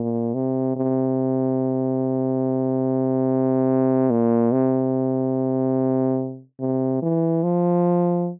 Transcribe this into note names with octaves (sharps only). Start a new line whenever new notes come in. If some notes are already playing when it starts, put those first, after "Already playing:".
Already playing: A#2
C3
C3
A#2
C3
C3
E3
F3